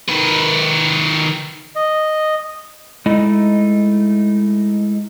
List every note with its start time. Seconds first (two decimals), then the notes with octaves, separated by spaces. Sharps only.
0.08 D#3 B4
1.76 D#5
3.06 G#3 A3 D#4 E4 D#5